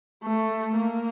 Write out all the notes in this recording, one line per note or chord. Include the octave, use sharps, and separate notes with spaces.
A3
A#3